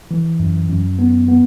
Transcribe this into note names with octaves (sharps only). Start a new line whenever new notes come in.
E3
F#2
F#2
B3
B3